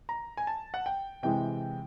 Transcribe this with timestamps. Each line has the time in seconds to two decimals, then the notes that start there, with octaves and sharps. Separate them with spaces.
0.09 A#5
0.37 G#5
0.47 A5
0.74 F#5
0.86 G5
1.23 C3 E3 G#3 G5